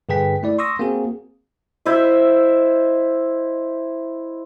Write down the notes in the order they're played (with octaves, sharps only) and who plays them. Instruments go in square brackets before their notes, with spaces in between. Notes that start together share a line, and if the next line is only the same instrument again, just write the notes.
[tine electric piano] G2 D3 G#4 B4 G5 B6
A3 E4 D5
C6 C#6 D#6 E6 A#6
A#3 C4 F#4 G#4
[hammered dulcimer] E4 C5 D#5 E5